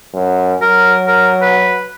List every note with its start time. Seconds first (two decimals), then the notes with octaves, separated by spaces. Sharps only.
0.14 F#2
0.62 F#3 A#4
1.08 A#4
1.42 B4